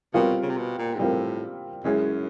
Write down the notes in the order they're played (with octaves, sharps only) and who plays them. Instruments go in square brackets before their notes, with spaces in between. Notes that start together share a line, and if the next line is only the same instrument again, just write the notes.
[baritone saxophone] B2 [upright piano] G3 C4 F4 A#4
[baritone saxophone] C#3
C3
B2
A#2
G#2
[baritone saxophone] A2 [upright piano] G3 C4 F4 A#4
[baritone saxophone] F#2 [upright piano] G#3 C#4 E4 G#4